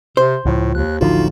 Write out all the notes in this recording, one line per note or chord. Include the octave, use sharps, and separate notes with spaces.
C3 C5
C#2 A2 F3
D#2 F#6
A1 D2 D3 F3 D#4 F4 F#4